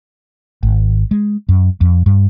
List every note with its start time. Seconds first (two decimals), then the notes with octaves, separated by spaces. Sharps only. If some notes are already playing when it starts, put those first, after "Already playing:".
0.63 G#1
1.11 G#3
1.49 F#2
1.81 F2
2.06 G2